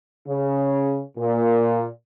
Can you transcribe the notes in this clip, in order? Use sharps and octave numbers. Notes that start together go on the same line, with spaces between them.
C#3
A#2